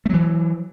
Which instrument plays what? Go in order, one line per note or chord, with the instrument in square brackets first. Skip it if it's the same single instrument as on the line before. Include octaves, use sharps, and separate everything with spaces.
[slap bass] A3
F#3
E3